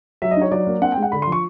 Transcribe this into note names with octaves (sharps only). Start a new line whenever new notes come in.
F#3 E5
D#5
D#4 C#5
F#3 D5
A#3
C4 F#5
G5
G#3
F#5
D3 B5
C6
F3
C#6